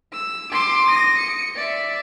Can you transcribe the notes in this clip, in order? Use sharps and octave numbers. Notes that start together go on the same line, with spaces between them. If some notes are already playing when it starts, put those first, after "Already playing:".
E6
C6 D6
D#6 A#6
C#7
D5 E5